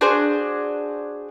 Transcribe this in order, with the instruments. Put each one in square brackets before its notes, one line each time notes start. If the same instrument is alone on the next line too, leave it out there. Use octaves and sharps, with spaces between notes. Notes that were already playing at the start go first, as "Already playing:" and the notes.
[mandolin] D4 F#4 G#4 C5